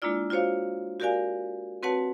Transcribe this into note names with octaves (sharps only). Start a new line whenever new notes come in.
G#3 A#3 D4 E4 F4 D5
F4 F#4 C5 C#5 F5
F#4 G4 A#4 D5 F5 G#5
C4 F#4 B4 C#5 F#5 A5